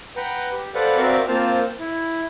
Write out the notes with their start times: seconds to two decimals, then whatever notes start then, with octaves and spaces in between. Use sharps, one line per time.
0.16 B4 F#5 G5 A#5
0.52 G4
0.75 A4 B4 C5 D5 F5 F#5
0.97 C4 F#4 A#4 D5 E5 F5
1.28 A#3 C4 F4 C5 A5 F6
1.80 E4